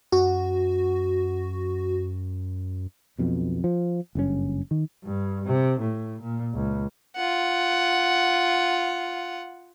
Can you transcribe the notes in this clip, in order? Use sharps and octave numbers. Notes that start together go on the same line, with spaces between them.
F#2 F#4
B1 F2 B2
F3
F#1 G2 C3 C#4
D#3
G2
C3
A2
A#2
C#2
F4 F#5